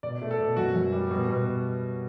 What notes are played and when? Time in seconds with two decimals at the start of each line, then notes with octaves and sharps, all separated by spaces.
0.03 B2 D5
0.22 A3
0.31 A4
0.40 B2
0.56 F#2 F#4
0.76 F#2
0.92 G3
1.11 B2
1.28 B2